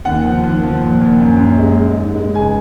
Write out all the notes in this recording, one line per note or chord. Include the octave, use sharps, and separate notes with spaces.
D#2 F#5
F3
D#2
F3
A#2
A#2
F#2
F#2
G#3
G#3
G#2
G#3
C#2 G#5